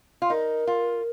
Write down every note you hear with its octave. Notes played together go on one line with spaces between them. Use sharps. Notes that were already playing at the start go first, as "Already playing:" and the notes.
F4
D#4 A#4
F4